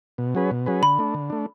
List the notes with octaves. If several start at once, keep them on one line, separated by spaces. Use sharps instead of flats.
B2
F#3 C#4 G#4 B4
B2
F#3 C#4 G#4 B4
D3 B5
A3 D4
D3
A3 D4